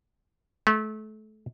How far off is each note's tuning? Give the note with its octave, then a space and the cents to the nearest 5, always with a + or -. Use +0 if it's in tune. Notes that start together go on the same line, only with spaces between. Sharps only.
A3 -30